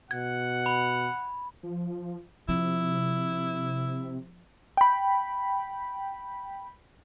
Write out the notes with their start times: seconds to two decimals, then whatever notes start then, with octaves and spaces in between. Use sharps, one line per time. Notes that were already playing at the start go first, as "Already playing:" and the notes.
0.11 B2 F#5 G#6
0.66 B5
1.63 F3
2.49 C3 F3 E4
4.77 G5 B5